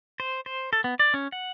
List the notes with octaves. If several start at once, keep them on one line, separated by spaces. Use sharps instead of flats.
C5
C5
A4
B3
D5
C#4
F#5